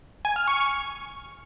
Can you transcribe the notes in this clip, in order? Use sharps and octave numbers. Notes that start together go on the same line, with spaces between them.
G#5
F6
C#6